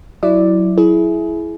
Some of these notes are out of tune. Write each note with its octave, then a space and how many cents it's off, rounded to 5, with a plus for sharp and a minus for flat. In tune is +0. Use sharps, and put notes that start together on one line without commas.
F#3 +0 E4 +0 D5 +5
E4 +0 G#4 +25